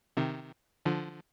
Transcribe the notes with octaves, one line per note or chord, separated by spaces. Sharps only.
C3 D#3
D3 F3